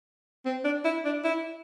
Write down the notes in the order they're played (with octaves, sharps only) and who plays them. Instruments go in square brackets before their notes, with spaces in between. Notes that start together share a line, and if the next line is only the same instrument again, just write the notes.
[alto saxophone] C4
D4
E4
D4
E4